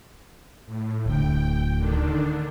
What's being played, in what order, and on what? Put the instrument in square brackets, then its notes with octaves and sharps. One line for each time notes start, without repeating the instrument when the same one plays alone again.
[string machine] A2
[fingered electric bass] D1 D2 [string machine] G5
[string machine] D3 D#3 D4